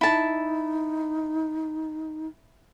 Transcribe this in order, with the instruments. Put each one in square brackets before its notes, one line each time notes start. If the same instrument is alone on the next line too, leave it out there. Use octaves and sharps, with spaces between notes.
[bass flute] D#4 [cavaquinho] E4 A5